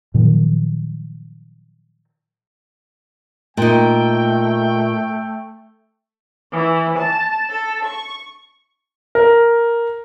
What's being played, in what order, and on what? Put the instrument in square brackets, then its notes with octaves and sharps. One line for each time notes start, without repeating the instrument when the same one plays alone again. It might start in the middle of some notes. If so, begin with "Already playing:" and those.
[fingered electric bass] A#2 D#3 F3 F#3
[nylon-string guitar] A#2 D#4 [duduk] A3 [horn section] G5
[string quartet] E3
A5
A4
C#6
[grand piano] A#4